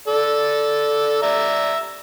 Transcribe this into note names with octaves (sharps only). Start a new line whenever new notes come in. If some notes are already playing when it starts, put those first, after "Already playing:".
A4 D5
D5 E5 A#5